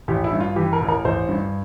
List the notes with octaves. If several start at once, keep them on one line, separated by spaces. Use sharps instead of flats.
A1 G4
E4
G2
F4
E3 G4
A#4
A1
A#4
A1 C5
G2